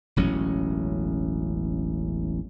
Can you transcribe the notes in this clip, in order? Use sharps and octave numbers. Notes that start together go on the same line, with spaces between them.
E1 A1 F#3 C#4